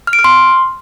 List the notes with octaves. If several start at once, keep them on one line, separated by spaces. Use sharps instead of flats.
F6
D7
F6
C6